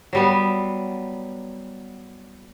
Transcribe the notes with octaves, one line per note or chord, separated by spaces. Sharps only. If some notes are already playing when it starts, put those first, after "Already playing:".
F#3 G3 B3